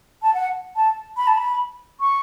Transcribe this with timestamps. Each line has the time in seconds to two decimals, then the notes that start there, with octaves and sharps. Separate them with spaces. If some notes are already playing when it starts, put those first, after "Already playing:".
0.22 A5
0.34 F#5
0.76 A5
1.17 B5
1.27 A5
1.37 B5
2.00 C#6